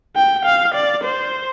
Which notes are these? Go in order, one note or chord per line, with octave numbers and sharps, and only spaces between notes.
G5
F5
D5
C5